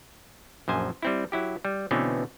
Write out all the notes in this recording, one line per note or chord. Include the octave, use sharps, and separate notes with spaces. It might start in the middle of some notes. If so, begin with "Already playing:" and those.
A#1 F#2 C5 G#5
G3 C4 E4
F#3 E4 G4
G3
B2 D3 E3 A3 C4 C#4